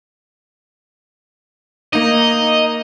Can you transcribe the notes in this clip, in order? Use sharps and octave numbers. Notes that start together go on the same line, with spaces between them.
A#3 D#4 D#5